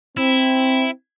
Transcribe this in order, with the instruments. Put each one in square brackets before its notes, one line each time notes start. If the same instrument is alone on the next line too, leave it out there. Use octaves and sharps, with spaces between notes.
[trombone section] C4 [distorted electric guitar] E4